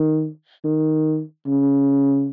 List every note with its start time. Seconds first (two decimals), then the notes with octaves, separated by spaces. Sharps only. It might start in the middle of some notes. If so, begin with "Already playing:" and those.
Already playing: D#3
0.64 D#3
1.46 C#3